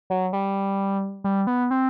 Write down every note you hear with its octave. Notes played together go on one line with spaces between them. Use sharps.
F#3
G3
G3
B3
C4